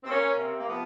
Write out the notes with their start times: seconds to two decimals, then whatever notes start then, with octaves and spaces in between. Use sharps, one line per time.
0.04 C4
0.09 A#3 C#4
0.38 C3 C4
0.57 A#3
0.68 F3 B3